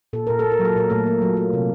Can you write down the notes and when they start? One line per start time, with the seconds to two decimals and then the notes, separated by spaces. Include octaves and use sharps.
0.13 A#2 A4
0.27 A#2 A#4
0.39 A4
0.44 A#3
0.52 A#4
0.59 F#3
0.65 A4
0.76 A#2 A#4
0.90 A#2 A3 A4
1.06 A#3
1.22 F#3
1.37 A#3
1.53 C3